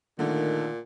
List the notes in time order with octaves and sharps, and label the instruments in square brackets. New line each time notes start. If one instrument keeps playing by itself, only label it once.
[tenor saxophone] A#2 [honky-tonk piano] D3 A3 A#3 [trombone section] D#3